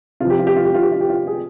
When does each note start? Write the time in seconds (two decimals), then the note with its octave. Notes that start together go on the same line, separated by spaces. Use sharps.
0.20 C3 F3 F4
0.30 G4
0.39 F4
0.47 G4
0.56 F4
0.65 G4
0.74 F4
0.83 G4
0.92 F4
1.00 G4
1.10 F4
1.27 G#4